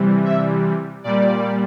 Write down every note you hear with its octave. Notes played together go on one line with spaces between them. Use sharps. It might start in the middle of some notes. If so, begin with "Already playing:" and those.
Already playing: C3 E3 G3
E5
A#2 G3 D5